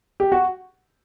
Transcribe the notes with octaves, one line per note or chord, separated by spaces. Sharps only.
G4
F#4